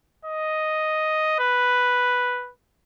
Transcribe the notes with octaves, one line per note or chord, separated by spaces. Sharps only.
D#5
B4